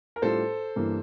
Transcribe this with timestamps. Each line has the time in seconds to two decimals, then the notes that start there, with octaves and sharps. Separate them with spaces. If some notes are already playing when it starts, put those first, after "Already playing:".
0.16 A#4
0.22 A2 G3 D4 F4 A4 C5
0.76 G2 E3 A#3